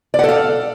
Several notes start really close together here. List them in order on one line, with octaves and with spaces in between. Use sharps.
D5 F#5 A4 F5